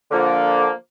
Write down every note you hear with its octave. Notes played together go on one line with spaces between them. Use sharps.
D3 F3 A#3